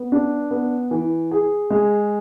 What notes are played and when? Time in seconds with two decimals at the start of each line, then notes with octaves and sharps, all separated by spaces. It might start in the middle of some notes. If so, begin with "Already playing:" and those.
Already playing: B3
0.12 D4
0.51 B3
0.91 E3
1.31 G#4
1.70 G#3